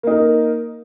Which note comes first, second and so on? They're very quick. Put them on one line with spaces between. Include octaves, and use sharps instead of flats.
A#3 D#4 A#4